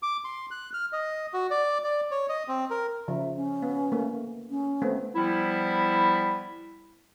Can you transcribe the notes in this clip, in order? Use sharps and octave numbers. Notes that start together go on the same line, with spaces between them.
D6
C6
F#6
F6
D#5
F#4
D5
D5
C#5
D#5
C4
A#4
C#3 F3 E5
C#4
B3
A3 A#3
C#4
A3 B3 C4
F3 G3 B3 E4